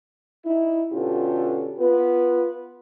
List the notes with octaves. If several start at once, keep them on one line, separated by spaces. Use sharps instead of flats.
D#4 E4
B2 D3 C#4 F4 G4 A4
B3 F4 B4